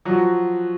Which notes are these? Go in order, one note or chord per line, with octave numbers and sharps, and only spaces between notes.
F3 F#3 F#4